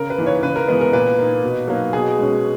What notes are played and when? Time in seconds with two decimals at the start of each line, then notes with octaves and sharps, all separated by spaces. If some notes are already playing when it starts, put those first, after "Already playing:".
Already playing: C#3 A#4
0.10 B4
0.18 E3 A#3 D#4
0.26 C#5
0.43 C#3 B4
0.56 A#4
0.68 E3 G#3 B3 B4
0.81 A#4
0.93 A#2 B4
1.19 A#3 D#4
1.43 B2
1.68 F#3 A#3 D#4
1.93 B2 G#4
2.18 G#3 C#4